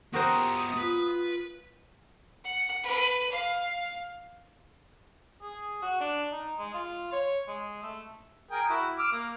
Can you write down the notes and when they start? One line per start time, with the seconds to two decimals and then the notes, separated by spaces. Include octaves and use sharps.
0.13 B3 F#4 G4 A#4 C5 D#6
0.77 F4 B4
2.44 F#5
2.83 B4
3.32 F5
5.42 G#4
5.82 F#4
6.01 D4
6.32 D#4
6.58 G#3
6.74 F4
7.12 C#5
7.48 G#3
7.83 A3
8.51 G#4 A#4 G5
8.70 E4 F#4
8.99 D6 E6 F6
9.12 A#3